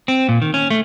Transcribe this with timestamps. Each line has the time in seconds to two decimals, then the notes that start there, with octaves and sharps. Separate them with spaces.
0.08 C4
0.29 A#2
0.42 D#3
0.54 C#4
0.70 A3